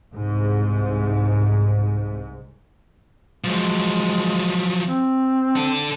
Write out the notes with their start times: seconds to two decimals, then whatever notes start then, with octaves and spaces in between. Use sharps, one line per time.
0.13 C2 G#2
3.44 F3 F#3 G#3
4.87 C4
5.56 D4 A4